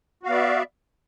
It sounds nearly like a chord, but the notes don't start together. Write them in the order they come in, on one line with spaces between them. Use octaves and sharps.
F#4 F5 B3 D5 E5